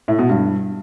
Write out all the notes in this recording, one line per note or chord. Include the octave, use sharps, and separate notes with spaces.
A2
B2
G2